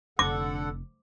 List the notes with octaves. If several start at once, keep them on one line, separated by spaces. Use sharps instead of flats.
F1 D3 A4 F#5 D6